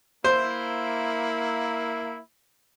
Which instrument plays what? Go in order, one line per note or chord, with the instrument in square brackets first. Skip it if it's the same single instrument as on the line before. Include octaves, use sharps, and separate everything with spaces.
[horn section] A#3 E4 [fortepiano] C5